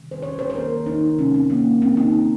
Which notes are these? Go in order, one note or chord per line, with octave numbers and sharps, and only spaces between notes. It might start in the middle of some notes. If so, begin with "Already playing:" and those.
Already playing: C3 D#3 G3
C5
C#5
C5
C5
D#3 A#3 A#4
D#4
C3 F3 G#3 C#4
C4
A#3
C#3 G#3 C4
D#4